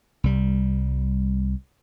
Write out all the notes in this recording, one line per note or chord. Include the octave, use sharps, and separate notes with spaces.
C2 G3